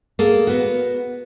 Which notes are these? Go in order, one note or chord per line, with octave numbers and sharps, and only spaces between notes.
A#3 G#4 A4 F5
B3 F#4